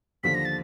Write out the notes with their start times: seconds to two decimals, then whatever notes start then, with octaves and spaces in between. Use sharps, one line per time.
0.23 D#2 D3 F3 B6
0.35 A#6
0.45 A6